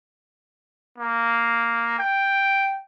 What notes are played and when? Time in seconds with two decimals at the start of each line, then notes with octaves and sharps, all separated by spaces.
0.98 A#3
1.99 G5